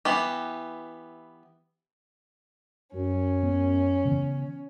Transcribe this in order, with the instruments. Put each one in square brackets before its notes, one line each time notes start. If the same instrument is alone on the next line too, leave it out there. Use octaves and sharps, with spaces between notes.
[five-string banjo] E3 B3 G4
[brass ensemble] F#2 [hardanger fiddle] C#4
[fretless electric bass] B3
C#3 E3 B3